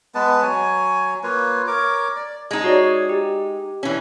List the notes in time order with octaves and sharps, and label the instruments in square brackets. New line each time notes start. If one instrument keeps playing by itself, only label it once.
[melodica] G#3 B3 B4 A5
F#3 C#5 G#5
A#3 F4 B4 C#5
A#4 C#5 D6
D5
[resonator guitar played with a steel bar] G#3 D#4
[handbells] F#4 C#5 D5
G4
[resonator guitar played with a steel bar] E3 C#4